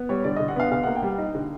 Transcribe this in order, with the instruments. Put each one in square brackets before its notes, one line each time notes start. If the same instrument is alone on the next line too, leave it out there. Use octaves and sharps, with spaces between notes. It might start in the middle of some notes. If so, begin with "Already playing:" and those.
Already playing: [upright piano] B3
G3 C#5
D3 D5
D3 D#5
F#5
B3 F5
D3 F5
A#3 F#5
G5
G3
D#4
D3